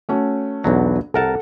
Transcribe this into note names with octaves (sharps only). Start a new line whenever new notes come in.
A3 C#4 F#4
B1 E2 F#3 D4
C2 A4 A#4 F#5 A5